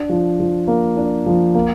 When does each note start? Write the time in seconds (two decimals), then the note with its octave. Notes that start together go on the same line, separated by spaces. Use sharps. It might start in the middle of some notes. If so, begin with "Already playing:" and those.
Already playing: D4
0.09 F3
0.40 F3
0.67 A#3
0.97 D4
1.26 F3
1.55 A#3